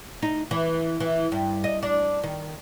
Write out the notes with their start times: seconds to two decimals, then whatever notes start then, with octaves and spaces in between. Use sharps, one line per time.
0.22 D#4
0.51 E3
1.00 E3
1.32 G2
1.64 D#5
1.83 D4
2.24 D#3